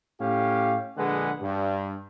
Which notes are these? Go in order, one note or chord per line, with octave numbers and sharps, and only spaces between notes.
A2 C#4 G4 F5
A#1 D3 G#3 G#4 B4 F#5
G2